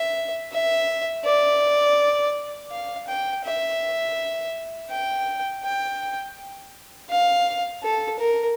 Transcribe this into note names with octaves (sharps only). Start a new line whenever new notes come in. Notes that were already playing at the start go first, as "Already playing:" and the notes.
Already playing: E5
E5
D5
F5
G5
E5
G5
G5
F5
A4
A#4